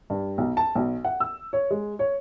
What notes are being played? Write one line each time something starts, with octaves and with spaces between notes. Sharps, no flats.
G2
B1
A5
B1
F#5
E6
C#5
G#3
C#5